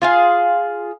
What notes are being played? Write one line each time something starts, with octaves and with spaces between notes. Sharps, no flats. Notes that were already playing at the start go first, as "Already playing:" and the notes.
F4 G#4 F5